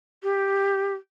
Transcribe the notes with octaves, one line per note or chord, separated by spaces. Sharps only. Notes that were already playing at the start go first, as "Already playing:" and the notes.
G4